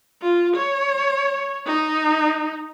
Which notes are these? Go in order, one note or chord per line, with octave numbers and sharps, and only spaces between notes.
F4
C#5
D#4